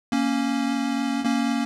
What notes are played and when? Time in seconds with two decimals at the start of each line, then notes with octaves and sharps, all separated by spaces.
0.12 A#3 C#4
1.24 A#3 C#4